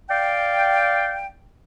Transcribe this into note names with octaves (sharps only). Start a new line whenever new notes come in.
D5 F5 G5